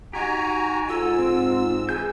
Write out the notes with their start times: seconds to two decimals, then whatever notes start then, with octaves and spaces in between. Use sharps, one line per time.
0.13 D#4 F#4 G4 G#5 A#5
0.89 G#2 F4 A4 G#5 E6
1.18 C4
1.89 E3 G#4 G#5 G6